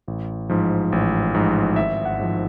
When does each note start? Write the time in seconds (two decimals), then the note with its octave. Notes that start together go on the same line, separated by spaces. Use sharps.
0.08 A1
0.50 G#2 F3
0.92 A1
1.35 G#2 F3
1.76 G#1 E5
2.05 F#5
2.19 G#2 F3